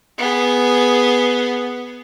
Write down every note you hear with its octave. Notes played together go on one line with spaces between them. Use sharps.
B3 G#4